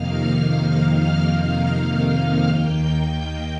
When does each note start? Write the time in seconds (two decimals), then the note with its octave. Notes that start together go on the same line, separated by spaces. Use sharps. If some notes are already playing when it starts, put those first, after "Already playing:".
Already playing: F2 C3 D#3 A#3 D#4 F5 F6
2.46 D#2 D#3 A#3 D#4 G5 G6
3.13 G5 G6